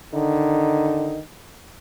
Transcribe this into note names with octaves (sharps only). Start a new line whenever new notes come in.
D3 D#3 D#4